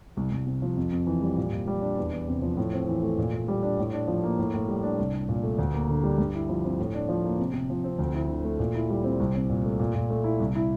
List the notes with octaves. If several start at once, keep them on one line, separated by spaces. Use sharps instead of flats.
C2
C2
C3
F3
F2
F2
E3
G3
A#2
A#2
G3
D4
E2
E2
C3
F3
A2
C4
E3
A3
A#2
A#2
G3
D4
A2
D4
F3
A#3
A2
A2
G3
D4
C2
D4
A#2
A3
D2
A#3
D3
G3
G2
E4
F3
C4
A2
D4
F3
A#3
C3
C3
F3
C4
D2
E4
D3
A3
A#2
E4
G3
C4
C2
C4
A#2
A3
A#2
A#2
A3
E4
C2
E4